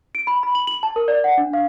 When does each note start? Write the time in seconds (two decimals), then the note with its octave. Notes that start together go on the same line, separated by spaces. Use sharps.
0.15 D7
0.27 B5
0.43 B5
0.55 F#7
0.67 F#7
0.83 A5
0.96 A#4
1.08 D5
1.24 F#5
1.38 D4
1.53 F5